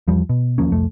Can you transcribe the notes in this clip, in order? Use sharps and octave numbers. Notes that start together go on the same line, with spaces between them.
E2 F3 G3
B2
D#2 F3 A#3 C#4
C2 F2 A3